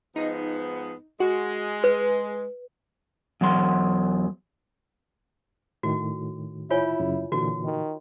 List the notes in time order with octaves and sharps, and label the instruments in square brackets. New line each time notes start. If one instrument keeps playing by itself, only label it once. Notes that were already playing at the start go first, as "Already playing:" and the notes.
[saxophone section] G#2 F3 B3 [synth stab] D#4
[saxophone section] G#3 [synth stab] F#4
[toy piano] B4
[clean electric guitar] E2 F#3 C6
[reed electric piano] A2 D#3 [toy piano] F#4
[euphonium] E4 [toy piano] F4 C#5 G#5
[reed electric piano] F#2 C#3
[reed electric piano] A#2 D3 E3 [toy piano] F#4
[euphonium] D#3